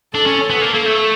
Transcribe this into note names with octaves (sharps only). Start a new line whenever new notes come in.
D4 A4
C#4
B3
A#3
A#3
A3 A4